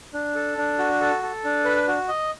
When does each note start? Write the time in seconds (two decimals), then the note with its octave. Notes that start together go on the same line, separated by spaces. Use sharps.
0.14 D4
0.35 A4
0.58 D4
0.78 F#4
1.01 A4
1.23 A4
1.44 D4
1.65 B4
1.88 F#4
2.08 D#5